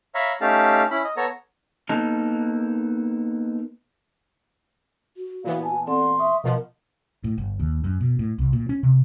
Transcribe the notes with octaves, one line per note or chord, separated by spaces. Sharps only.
C#5 E5 F5 A#5 B5
A3 C#4 D#4 G4 F5 A5
C#4 E4 B5
D#5
B3 A4 C#5 A#5
A#3 B3 D#4 A4 A#4
F#4
A#2 E3 B3 F5
G#5 A5
C4 A4 D5 F#5 C6
E5 C#6 D#6
B2 F3 B3 A#4 D#5
A2
G1
D#2
F#2
B2
A2
C2
A#2
C#4
C3